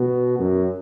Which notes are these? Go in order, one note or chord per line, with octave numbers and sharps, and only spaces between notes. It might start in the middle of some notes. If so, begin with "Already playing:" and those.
Already playing: B2
F#2